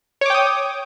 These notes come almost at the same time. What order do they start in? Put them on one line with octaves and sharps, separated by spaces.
C#5 D6 G5 D#6